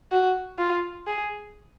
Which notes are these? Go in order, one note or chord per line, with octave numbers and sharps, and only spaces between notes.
F#4
F4
G#4